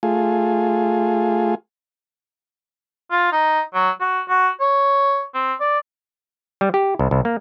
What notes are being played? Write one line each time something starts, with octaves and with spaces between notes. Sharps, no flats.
A3 F4 G#4
F4
D#4
F#3
F#4
F#4
C#5
C4
D5
G3
G4
C2
C2
A#3